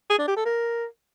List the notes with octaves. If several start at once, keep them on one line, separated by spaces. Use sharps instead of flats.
G#4
D4
G4
A4
A#4